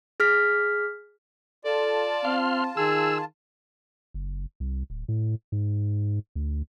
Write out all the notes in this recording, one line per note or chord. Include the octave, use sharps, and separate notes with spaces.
G#4 F6 B6
F4 A4 D5 A5
C4 F5 C6
D#3 G#4 E6
F#1
C2
D1
A2
G#2
D2